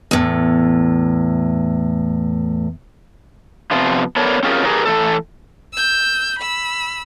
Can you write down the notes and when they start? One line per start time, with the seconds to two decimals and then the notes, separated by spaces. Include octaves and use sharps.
0.11 E2 A2
3.71 C3 F3 B3 F4
4.16 B3 D4 A4 A#4 C#5
4.43 C4 C#4 F4 G4 G#4 A#4
4.64 G4 G#4 A#4 B4
4.86 A2 E3 A#3 A4
5.74 E6 G6
6.39 B5 E6